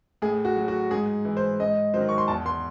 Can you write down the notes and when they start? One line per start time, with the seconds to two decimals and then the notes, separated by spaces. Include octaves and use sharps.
0.22 A2 G#4
0.45 F#4
0.57 F#3
0.68 F#4
0.91 G#2 G#4
1.25 E3
1.37 C5
1.59 G#2 D#5
1.94 D#3 F#3 C5
2.09 C#6
2.18 C6
2.28 E2 A5
2.46 C6